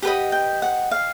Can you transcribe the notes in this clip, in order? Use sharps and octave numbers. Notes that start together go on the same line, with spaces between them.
G4 B4 D#5 F#5
G5
F#5
F5